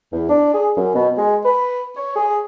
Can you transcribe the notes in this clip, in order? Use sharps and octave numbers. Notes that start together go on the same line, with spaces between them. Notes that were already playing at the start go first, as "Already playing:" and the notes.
E2
D4
G#4
F#2
B2
G#3
B4
C#5
G#4